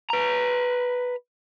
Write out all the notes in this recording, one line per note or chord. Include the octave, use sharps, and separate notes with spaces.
B4 A#5